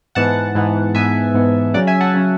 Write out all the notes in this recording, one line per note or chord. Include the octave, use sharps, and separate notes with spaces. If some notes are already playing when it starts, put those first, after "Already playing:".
G#2 E3 B3 F#5 A5
G#2 E3 B3
G#2 E3 B3 E5 G#5
G#2 E3 B3
C#3 F#3 C#4 D5 F#5
E5 G#5
F#5 A5
C#3 F#3 C#4